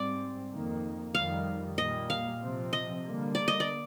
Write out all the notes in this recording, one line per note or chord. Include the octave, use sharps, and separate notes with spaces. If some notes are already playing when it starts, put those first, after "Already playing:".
Already playing: G#2 G3 C4 D5
F2 D#3 A#3
F2 D#3 G3 F5
A#2 G3 A#3 D#5
F5
C3 F3 C4
D#5
D3 G3 A#3
D5
D#5
D5